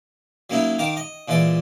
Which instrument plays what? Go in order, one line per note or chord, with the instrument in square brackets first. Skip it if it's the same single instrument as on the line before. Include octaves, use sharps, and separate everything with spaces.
[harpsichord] F#3 A#3 C#4 D#4 E4
D#3 A#4 F5 D6
D#5
A#2 E3 G#3 D5